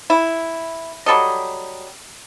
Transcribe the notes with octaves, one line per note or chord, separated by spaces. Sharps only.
E4
F#3 G3 A4 D#5